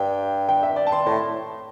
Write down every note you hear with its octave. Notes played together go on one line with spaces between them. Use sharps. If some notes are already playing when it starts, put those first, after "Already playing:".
Already playing: G2 G5
G5
E5
D5
A5
C6
A2